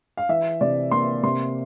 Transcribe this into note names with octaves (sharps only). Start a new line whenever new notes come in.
F5
E3 E5
C3 D5
A#3 C6
C3 C6